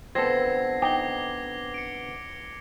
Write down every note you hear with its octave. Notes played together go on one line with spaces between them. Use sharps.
F2 D3 B3 C4 A4 G#6 A#6 C7
D#4 G5 D6 A#6 G7
C#7 D7